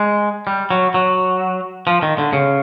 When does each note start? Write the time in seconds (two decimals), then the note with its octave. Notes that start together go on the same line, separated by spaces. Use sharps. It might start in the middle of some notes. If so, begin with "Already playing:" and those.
Already playing: G#3
0.47 G3
0.71 F#3
0.94 F#3
1.87 F3
2.02 D#3
2.18 D3
2.33 C#3